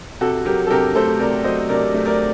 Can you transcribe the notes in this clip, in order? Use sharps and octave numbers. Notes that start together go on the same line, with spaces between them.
C3 F#4 A4
F#3 G4 A#4
A4
C3 G4 A#4
A3 A4 C5
C3 A#4 D5
F#3 C5 D#5
C3 A#4 D5
A3
A#4 D5